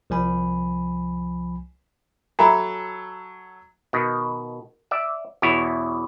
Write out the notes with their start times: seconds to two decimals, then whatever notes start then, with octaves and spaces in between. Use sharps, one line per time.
0.10 C2 F3 G#5 B5
2.39 F#3 A4 E5 G#5 A#5 B5
3.93 B2 D#3
4.91 D5 E5
5.42 E2 B2 E4 C#5